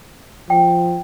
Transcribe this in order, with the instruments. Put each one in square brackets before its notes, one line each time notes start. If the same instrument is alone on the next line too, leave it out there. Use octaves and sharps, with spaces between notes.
[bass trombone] F3 [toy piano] G5